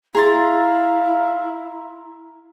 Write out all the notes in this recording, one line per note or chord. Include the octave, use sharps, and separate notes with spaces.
E4 G#4 F5 A#5 C6 A6